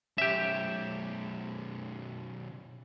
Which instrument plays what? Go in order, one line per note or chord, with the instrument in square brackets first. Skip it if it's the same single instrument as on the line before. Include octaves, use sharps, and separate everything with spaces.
[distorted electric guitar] B1 C#4 [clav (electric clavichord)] G4 E5